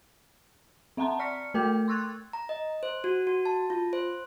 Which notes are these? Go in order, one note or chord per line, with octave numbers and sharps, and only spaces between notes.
C4 E5 F#5 A5 A#5 C6
D5 C#6 F6 B6 C#7
A3 A4 A#4 G5 D6 G6
C6 C#6 E6 F#6 G#6 A6
A#5
D#5
C5
F#4
F#4
A5
F4
C5